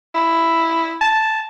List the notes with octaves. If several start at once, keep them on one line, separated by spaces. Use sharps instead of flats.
E4
A5